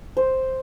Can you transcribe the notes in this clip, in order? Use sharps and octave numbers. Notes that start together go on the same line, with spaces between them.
C5